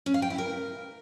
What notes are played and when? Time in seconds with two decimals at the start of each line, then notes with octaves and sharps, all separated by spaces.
0.06 C#4
0.14 F5
0.22 G5
0.30 E4
0.38 A#4